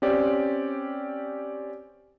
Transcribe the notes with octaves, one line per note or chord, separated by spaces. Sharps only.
C4 C#4 G4 D5